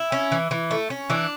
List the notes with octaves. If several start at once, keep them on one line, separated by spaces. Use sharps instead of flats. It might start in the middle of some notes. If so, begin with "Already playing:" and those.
Already playing: E4
C#4
E3
E3
A3
C#4
E3 D4